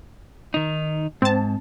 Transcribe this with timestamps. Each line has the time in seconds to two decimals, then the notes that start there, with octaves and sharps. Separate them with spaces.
0.54 D#3 D#4
1.22 G#2 C4 A5